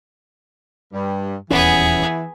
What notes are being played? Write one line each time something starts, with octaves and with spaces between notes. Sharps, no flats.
G2 G3
D#1 E2 E3 B3 C#4 G#4